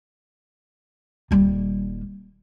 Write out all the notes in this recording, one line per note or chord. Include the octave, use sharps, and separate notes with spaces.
D#1 G3